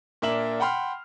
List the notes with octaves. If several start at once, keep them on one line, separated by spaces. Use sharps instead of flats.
A#2 A#3 D4 E5 E7 F#7
F#5 G5 B5 C6 F6